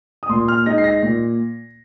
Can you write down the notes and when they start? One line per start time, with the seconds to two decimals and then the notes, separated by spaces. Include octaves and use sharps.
0.23 D#6
0.29 A#2 C6
0.48 F6
0.66 G#3 D#4 A#6
0.78 C7
0.84 A#6
1.03 A#2